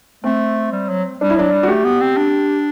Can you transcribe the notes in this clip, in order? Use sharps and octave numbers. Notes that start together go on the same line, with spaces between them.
A3 C4
G3
F#3
G3 D4
E4
F#3 D4
G3
F#4
A3 G4
B3
C4
D4